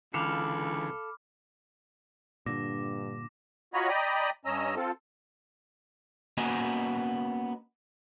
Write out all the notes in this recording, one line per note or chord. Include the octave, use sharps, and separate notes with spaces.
C#2 D3 E3 A4 F5 B5 D6 F6
G2 A#2 D3 D6 A#6
F4 F#4 C#5 D#5 A#5 B5
D5 D#5 G5 A#5 B5 D#6
G2 C#4 D#5 A#5 E6
C4 F4 A4
A#3 B3 C#4 F#4 D#5 G#5